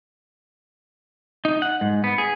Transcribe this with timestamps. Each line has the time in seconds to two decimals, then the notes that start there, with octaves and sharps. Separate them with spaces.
1.45 D#4
1.62 F#5
1.81 G#2
2.04 B3
2.18 G#4